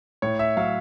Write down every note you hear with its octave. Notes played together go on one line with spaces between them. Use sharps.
A2 C#5
E5
F#3 F5